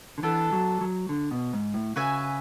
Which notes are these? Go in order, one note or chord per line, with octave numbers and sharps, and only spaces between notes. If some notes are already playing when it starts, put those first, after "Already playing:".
D3
E3 B3 D4 A4
F#3
F#3
D3
B2
G#2
A2
C#3 F#4 B4 E5 G#5